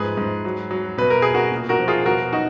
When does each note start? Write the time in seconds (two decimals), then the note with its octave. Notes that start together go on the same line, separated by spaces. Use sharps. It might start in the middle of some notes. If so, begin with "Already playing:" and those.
Already playing: G#2 F3 G#4 B4
0.17 G#2
0.45 F#3
0.71 F#3
0.98 B2 B4
1.10 A#4
1.22 B2 G#4
1.34 F#4 A#4
1.52 A#2
1.69 F#4 A#4
1.79 F3
1.88 F4 G#4
2.06 B2 F#4 A#4
2.32 F#3 D#4 F#4